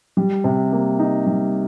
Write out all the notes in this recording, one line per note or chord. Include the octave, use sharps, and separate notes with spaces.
G3
C3
A#3
D#4
G3